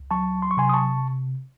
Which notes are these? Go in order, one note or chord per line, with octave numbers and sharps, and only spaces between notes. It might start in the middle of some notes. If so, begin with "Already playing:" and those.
Already playing: C#2
F#3 A5 C#6
C6
C#6
C3 G#5 C6
D#6
A5 C#6